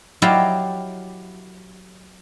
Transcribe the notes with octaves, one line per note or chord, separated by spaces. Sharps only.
F#3 E4 G4 D5 D#5 F5